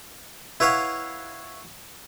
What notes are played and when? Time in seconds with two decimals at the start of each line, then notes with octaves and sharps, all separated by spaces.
0.60 E4 B4 C#5 F5 F#5